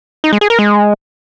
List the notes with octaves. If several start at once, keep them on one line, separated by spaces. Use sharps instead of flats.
D#4
G#3
G#4
A#4
G#3